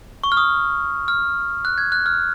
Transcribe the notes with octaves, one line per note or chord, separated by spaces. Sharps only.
C#6
F6
D#6
F6
F#6
G#6
F#6
F6